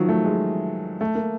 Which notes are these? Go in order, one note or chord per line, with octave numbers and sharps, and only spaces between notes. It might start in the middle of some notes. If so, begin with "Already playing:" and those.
Already playing: D#3 F3 F#3
A3
G#3
A3
A#3